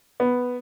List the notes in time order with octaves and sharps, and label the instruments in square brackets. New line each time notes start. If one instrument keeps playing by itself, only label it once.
[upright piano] B3